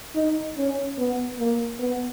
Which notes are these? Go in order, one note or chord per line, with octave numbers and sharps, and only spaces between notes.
D#4
C#4
B3
A#3
B3